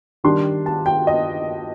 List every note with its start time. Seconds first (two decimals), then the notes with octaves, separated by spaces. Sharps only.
0.24 D#3 G3 D4 C6
0.66 A5
0.86 G5
1.07 D#5